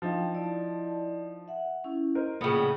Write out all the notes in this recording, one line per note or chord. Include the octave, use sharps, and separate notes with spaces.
F3 D4 D#4 F5 G5
E4 D5 A5
E5 F#5
C#4 E4
A#4 C5 D#5
A#1 A2 C#3 B3 G5